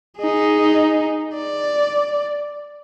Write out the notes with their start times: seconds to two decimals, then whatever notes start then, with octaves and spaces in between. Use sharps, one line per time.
0.18 D#4 G#4
1.35 D5